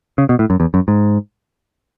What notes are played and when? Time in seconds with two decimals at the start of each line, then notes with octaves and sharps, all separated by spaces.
0.18 C#3
0.29 B2
0.39 A2
0.50 F#2
0.60 E2
0.74 F#2
0.88 G#2